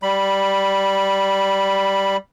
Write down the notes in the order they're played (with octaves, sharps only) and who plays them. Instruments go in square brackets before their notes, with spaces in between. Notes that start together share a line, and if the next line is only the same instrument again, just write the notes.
[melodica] G3 B5